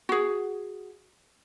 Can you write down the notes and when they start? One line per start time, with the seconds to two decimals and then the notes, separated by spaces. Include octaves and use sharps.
0.09 F#4 G#4